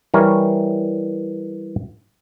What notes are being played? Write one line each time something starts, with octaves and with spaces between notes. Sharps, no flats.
E3 G3 A#4 C#5